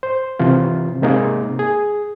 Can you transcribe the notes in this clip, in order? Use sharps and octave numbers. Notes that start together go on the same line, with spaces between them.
C5
C3 E3 F4
C3 G#3 A#3 D#4
G#4